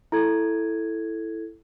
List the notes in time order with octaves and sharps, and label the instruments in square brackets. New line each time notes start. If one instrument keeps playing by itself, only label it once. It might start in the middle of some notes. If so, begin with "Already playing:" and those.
[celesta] E4 A4 G#6